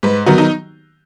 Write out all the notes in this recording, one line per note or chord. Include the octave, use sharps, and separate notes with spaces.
G#2 B4
D#3 F#3 B3 D#4 F#4
D#4